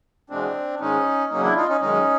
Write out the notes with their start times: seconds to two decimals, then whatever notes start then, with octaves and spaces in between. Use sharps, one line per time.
0.30 E2 B2 G#3 C4 D4
0.80 G#2 D#3 G#3 C#4 D#4
1.30 E2 C#3 F#3 A#3 C#4 D#4
1.43 D4 E4
1.56 D#4 F4
1.69 C#4 D#4
1.81 F#2 D#3 G#3 C#4 D#4